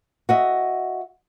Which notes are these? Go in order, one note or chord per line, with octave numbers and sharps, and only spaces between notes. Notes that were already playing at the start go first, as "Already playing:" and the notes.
F#4 D#5 E5